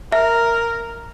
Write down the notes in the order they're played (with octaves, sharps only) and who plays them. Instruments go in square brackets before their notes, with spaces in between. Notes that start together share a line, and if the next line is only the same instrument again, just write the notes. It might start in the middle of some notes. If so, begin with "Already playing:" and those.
[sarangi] A#4 [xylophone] E5